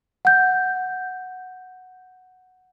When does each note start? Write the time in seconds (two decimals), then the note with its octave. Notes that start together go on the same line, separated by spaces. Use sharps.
0.25 F#5 G6